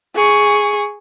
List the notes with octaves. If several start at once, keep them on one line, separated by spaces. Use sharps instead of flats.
G#4 C#6